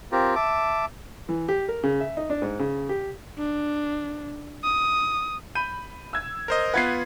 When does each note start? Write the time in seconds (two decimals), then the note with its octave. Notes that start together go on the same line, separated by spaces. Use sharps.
0.12 C4 F4 G4 A#4
0.35 E5 A5 D6
1.29 E3
1.48 G4
1.69 A#4
1.84 C#3
2.01 E5
2.17 D#4
2.30 D4
2.42 G#2
2.59 C#3
2.89 G4
3.38 D4
4.64 D#6
5.55 B5 G6 D#7
6.13 E6 G#6
6.48 A#4 C5 D#5
6.74 B3 F4 B4 F#5 G#6 C7